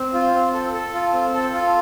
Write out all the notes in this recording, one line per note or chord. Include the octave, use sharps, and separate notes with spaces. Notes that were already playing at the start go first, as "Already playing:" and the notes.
Already playing: C4
F4
C4
A4
A4
F4
C4
A4
F4